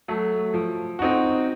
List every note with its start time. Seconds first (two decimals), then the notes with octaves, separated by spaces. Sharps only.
0.08 F#3 A3
0.54 F3
0.99 C4 D#4 F#4